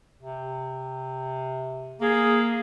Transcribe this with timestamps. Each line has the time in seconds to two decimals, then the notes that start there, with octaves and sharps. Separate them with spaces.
0.21 C3
2.00 A#3 G#4